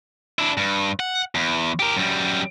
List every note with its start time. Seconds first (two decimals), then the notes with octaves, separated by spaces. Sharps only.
0.39 D4 E4
0.57 G2
1.00 F#5
1.35 E2
1.79 G4 A#4
1.97 F#2 G3